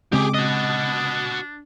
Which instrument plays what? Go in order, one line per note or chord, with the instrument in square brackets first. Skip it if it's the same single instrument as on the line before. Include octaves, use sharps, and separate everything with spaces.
[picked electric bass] C#3 G#3 C4 [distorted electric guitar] G4 G#4 [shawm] D6
[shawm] D4 [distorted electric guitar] F#4 D#5